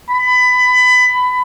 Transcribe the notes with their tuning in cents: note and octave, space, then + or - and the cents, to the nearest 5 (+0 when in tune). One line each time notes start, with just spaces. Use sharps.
B5 +20